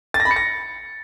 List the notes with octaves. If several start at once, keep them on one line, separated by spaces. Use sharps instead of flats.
A6
A#6
B5
C#7
A#6